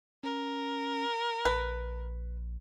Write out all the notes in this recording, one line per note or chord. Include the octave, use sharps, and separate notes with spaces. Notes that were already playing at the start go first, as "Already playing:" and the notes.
C#4 A#4
A#1 B4